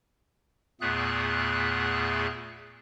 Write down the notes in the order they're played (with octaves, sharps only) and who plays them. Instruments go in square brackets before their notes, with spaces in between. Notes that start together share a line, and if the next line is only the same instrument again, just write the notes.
[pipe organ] E2 A#2 A3 B3 G#4 F#6